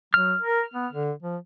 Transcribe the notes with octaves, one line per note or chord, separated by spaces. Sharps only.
F#3 F6
A#4
B3
D3
F3